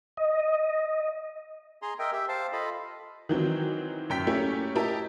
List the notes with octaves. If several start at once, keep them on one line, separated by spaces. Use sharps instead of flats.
D#5
G#4 A#5 C6
A#4 D#5 E5 G5
G4 E5
C5 F5 A5
F4 A4 D#5 B5
D#3 E3 F#3 C4
F#2 G5 B6
A3 A#3 C#4 E4 G4
E4 G4 A#4 D#5 A5